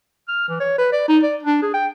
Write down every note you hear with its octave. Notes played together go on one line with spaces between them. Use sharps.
F6
E3
C#5
B4
D5
D#4
D5
D4
G#4
G5